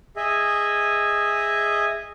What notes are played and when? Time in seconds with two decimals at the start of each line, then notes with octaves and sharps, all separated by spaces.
0.16 G#4 D#5 E5